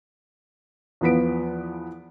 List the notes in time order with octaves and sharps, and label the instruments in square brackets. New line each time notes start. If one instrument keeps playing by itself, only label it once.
[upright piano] E2 F3 B3 B6 D7